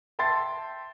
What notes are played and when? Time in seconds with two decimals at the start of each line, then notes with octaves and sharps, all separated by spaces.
0.19 E5 G5 A5 C6 A6 C7